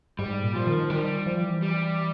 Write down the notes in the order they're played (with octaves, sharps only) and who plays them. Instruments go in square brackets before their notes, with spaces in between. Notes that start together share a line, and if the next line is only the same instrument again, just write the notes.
[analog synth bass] G#2 [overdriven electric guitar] G3
[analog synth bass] A#2
[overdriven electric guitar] F3
[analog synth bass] D#3
[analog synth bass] D#3 [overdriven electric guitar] G3
[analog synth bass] F3
E3
[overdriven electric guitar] G3